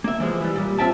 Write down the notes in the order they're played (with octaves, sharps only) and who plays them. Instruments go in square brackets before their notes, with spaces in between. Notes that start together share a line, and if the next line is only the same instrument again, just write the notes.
[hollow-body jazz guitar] A#3 E5
E3 F3 G#3
E3 G3
A#2 G3
C4 F4 E5 G5 A5